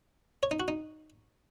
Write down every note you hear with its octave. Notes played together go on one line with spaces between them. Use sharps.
C#5
D#4
F#4
D#4